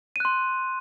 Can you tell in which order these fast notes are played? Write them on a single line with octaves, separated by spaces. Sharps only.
D#7 F#6 C6